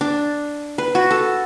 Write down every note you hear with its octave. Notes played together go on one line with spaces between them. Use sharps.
D4
B4
F#4
A4